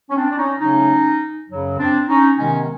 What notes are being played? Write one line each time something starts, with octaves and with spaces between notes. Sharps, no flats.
C#4
C4 D4
D4
C#4 D#4
C#3 F#3 A3 C#4 D#4
F#2 C#3 F#3
C4 D4
C#4 D#4
C3 D#3 G#3 B3 C#4